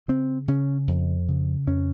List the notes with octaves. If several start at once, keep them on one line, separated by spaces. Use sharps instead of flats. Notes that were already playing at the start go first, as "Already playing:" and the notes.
C#3 C4
C#3 C#4
F2
C#3
F2 C#4